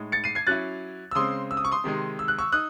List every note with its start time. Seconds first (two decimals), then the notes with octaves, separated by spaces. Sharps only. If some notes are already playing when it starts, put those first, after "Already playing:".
Already playing: A2 G#3 D#4
0.12 A6 C#7
0.24 C7 D#7
0.35 G#6 C7
0.47 F#3 C#4 E4 F#6 A6
1.11 E6
1.15 C#3 G#3 C4 C6 D#6
1.51 E6
1.57 D#6
1.65 C#6
1.72 C6 D#6
1.84 C3 D#3 G#3 D#4
2.19 E6
2.28 F#6
2.38 C#6 E6
2.52 D#4 D#6 F#6